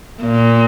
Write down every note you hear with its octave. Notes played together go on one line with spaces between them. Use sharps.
A#2